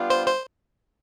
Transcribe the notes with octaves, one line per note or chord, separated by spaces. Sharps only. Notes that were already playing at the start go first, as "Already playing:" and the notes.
Already playing: G3 B3 D4 F4
C5
C5